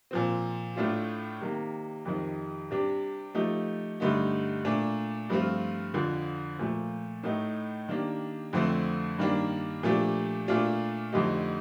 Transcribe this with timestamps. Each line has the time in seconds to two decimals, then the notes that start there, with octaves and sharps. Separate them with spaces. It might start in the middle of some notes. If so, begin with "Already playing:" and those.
0.11 A#2 F3 C4
0.76 A2 A3 D4 F4
1.41 C3 D#3 A#3
2.05 F2 C3 D#3
2.71 C3 G3 D4 G4
3.35 F3 A3 D#4 G4
4.00 G2 D3 A3 D#4 G4
4.65 A#2 A3 D4
5.30 G2 F3 A3 C4 F4
5.94 F2 D3 F3
6.59 A#2 F3 A3
7.23 A2 A3 D#4
7.89 D#3 A#3 D4 G4
8.53 F2 D3 F3 A3 C4
9.18 G2 D#3 A#3 D4
9.83 A#2 F3 A3 D4 G4
10.48 A#2 A3 D4 F4
11.12 F2 D3 A3 D#4 G4